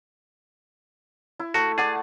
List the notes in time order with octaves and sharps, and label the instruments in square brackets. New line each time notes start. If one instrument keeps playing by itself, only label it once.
[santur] E4
[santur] A3 [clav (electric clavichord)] F#4
[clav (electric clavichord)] G#4 [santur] D5 F#5 A5